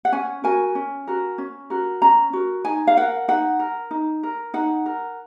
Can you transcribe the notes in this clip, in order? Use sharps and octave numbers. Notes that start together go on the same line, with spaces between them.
F#5
C#4 G#5
F#4 A#4 G#5
C#4
F#4 A#4
C#4
F#4 A#4
C#4 A#5
F#4 A#4
D#4 G#5
F5
A#4 F#5
D#4 F#5
A#4
D#4
A#4
D#4 F#5
A#4